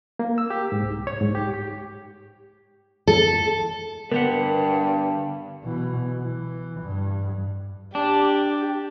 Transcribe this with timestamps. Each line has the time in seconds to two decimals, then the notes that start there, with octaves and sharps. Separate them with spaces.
0.19 A#3
0.38 E6
0.50 G4
0.72 G#2
0.83 C2
1.07 C#5
1.21 G#2
1.35 G4
1.54 G4
3.07 A4
4.12 G2 D3 B3 G4 A#4 F#5
5.64 B2 E3
6.21 E3
6.82 G2
7.95 D4 G4